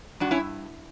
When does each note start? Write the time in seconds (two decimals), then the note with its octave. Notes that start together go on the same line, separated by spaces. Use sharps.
0.20 G2 D4 F#4
0.31 C#4 E4